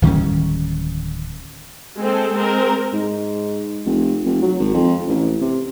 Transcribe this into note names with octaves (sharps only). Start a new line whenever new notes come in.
D1 D#3 G3 C#4
G#3 C4 A4
G#3 C4 A#4
G#2
F1
F1
F#3
G#1
F2
A1
C3